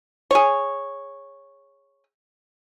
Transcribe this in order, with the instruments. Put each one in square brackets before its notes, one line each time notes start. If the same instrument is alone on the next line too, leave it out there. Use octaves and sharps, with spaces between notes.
[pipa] G#4 C#5